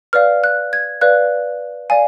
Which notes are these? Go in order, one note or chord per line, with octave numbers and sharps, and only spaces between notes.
B4 D5 F5 F6
F#6
G#6
B4 D5 F5 F#6
D5 F5 G#5